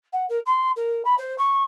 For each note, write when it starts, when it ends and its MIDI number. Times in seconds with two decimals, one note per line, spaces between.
0.12 0.26 78
0.29 0.39 70
0.46 0.70 84
0.76 1.02 70
1.05 1.15 83
1.18 1.36 72
1.38 1.63 85